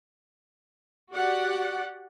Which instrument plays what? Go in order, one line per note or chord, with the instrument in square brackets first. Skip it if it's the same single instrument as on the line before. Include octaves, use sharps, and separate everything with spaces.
[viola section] F#4 G4 D5 F#5